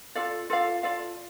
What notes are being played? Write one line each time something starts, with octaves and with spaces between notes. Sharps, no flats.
F4 A4 D5 F5
F4 A4 D5 F5
F4 A4 D5 F5